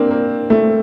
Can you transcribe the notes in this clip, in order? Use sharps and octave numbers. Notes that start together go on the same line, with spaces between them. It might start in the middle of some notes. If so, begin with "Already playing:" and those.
Already playing: A#3 C4 D4
A#3
A3